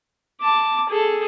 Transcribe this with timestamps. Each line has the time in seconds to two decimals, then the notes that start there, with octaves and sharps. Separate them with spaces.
0.41 A5 D6
0.89 G#4 A4